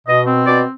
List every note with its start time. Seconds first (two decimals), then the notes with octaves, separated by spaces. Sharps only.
0.07 B2 D#5
0.27 C4
0.47 B2 D5